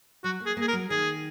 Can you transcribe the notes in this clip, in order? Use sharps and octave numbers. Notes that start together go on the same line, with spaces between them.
F#3 F#4
A#3
G#4
A#3 G#4
A#4
F#3
D#3 G#4